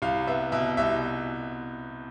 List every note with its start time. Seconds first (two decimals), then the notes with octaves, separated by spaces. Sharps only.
0.02 C2 F5
0.27 B3 E5
0.52 B2 E5
0.77 C2 E5